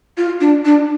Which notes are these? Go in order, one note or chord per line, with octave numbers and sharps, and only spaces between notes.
F4
D4
D4